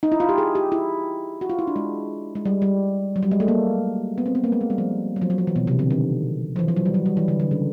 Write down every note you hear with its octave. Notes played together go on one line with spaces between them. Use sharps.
D#4
E4
F4
G4
G#4
G4
E4
F#4
F4
E4
D4
G#3
G#3
G3
G3
F#3
G3
G#3
A3
A#3
B3
C4
B3
A#3
G#3
A3
G3
F3
F#3
F3
F#3
F3
E3
B2
C3
D3
D#3
F3
E3
F3
F#3
G3
F#3
G3
E3
D3
D3
C#3